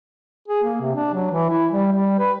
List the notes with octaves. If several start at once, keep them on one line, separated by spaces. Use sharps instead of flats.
G#4
A#3
C3
D4
F#3
E3
E4
G3
G3
B4